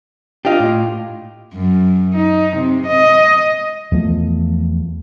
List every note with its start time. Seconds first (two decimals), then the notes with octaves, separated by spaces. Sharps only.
0.45 D4 F4 G4 D#5
0.60 A2
1.54 F#2
2.14 D#4
2.57 C3
2.87 D#5
3.92 E2 F3 A3